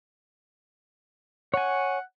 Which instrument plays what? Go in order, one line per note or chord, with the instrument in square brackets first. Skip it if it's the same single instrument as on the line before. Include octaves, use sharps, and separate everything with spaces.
[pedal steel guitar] C#5 G#5 [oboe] F#5